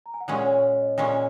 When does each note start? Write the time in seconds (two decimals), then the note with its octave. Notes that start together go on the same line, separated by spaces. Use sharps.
0.06 A#5
0.14 G#5
0.21 F#5
0.28 A#2 G#3 C#4 D#5
0.45 C#5
0.63 C#5
0.81 D#5
0.98 A#2 G#3 C#4 G#5